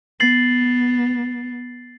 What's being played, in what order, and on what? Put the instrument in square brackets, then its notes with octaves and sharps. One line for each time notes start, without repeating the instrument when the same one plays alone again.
[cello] B3 [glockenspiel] A6 C7 F#7